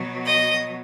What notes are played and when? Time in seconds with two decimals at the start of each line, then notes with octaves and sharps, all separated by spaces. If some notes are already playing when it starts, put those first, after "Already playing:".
Already playing: B2 F#3
0.25 D#5